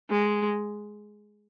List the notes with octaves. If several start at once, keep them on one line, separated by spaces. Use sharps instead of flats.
G#3